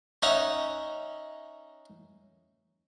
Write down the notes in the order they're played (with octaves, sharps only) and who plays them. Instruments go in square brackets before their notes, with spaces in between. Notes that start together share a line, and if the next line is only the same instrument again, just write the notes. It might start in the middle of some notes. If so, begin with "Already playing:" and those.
[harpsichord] C#4 D#4 D#5 E5 F#5 A#5